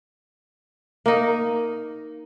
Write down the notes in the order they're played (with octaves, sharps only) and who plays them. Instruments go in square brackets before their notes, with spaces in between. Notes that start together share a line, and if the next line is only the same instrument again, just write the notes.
[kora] A#3 D#4